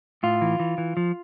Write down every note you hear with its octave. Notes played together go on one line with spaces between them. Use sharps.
A2 F4
E3
E3
E3
F3